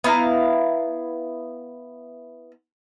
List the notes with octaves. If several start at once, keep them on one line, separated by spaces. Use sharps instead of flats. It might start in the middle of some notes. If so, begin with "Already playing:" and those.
B3 E4 F5 A#5